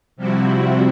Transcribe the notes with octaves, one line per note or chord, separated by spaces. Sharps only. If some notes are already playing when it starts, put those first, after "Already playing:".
C3 F3 G3 C4 E4 F#4